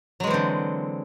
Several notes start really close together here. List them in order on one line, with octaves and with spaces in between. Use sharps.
F#3 G#3 E3 C4 D3